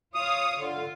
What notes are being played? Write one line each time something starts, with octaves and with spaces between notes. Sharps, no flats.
F4 C#5 F5 D#6
D3 F4